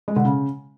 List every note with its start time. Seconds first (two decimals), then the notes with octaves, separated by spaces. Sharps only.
0.08 G#3
0.16 D3
0.25 C#3